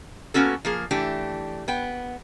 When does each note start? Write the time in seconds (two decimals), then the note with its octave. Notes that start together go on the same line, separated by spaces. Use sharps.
0.34 A#3 B3 C#4 F#4 A4
0.65 F3 A#3 G#4
0.91 E3 A3 D4 G4
1.68 B3 G5